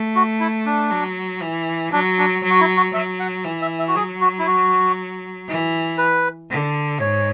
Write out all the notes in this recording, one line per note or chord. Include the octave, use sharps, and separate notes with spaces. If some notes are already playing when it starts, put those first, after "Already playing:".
Already playing: A3
F#4
E4
D4
F#3
E3
F#3 D4
D4
F#3
F#4
E4
F#4
F#3 E5
F#5
E3
E5
E5
F#4
F#3 G#4
F#4
E4
F#4
E3
B4
D3
G#2 C#5